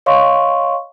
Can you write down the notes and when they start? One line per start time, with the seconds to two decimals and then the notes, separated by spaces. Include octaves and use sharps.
0.06 C#5 D#5 F5 C6 C#6